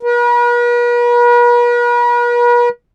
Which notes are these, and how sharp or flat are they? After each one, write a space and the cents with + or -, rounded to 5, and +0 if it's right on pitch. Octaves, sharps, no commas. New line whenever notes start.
B4 -45